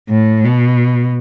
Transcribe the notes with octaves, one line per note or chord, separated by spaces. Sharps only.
A2
B2